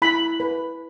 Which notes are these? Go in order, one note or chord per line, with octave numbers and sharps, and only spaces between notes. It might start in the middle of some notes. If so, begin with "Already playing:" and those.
E4 B5
B4